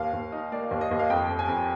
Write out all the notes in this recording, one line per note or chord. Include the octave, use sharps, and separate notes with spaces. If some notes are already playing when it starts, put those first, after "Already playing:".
Already playing: D#2 F5
D#2
D#4
A#3 D5
D#2
D#5
D#2
F5
F2 G5
F2
G#5
F2